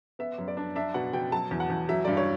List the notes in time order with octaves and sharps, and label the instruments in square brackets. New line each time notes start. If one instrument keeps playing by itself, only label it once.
[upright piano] B3 E5
F#2
D5
D4
D4 E5
B2 F#5
B2 G5
F#3 A5
E2
F#5
E2
F#3 E5
G2 D5
C#5